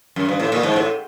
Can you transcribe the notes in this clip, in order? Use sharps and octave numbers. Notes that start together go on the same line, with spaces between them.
F#2
G2
A2
A#2
G#2
A2